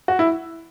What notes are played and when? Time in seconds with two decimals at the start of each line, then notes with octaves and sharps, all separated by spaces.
0.08 F#4
0.19 E4